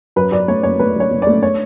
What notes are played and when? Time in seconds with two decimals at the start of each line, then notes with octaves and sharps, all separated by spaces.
0.16 F#2 B4
0.32 F#2 D5
0.48 A3 C#5
0.63 F#1 C#5
0.79 A3 B4
0.96 F#2 C#5
1.11 F#1
1.22 A3 D5
1.43 C#5